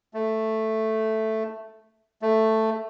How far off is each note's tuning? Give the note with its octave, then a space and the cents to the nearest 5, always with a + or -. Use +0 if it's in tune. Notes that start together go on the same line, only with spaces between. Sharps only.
A3 +0
A3 +5